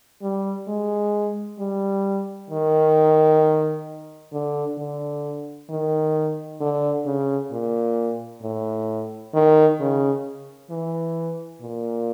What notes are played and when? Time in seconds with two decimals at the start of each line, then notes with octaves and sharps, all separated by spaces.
0.22 G3
0.68 G#3
1.59 G3
2.50 D#3
4.33 D3
4.78 D3
5.69 D#3
6.61 D3
7.05 C#3
7.52 A#2
8.42 A2
9.34 D#3
9.80 C#3
10.70 E3
11.62 A#2